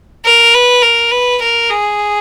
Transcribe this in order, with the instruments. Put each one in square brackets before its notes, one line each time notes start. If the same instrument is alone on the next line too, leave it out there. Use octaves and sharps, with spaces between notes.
[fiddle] A#4
B4
A#4
B4
A#4
G#4